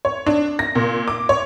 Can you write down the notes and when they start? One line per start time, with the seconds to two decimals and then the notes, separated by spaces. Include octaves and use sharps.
0.05 C#5
0.27 D4
0.59 A#6
0.75 A#2
1.08 D6
1.29 C#5